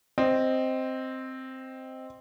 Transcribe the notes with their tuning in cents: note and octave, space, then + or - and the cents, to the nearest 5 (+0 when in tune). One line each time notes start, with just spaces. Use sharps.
C4 +0 D#5 +0